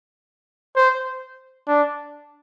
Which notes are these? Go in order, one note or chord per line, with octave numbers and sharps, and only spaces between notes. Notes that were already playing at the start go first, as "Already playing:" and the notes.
C5
D4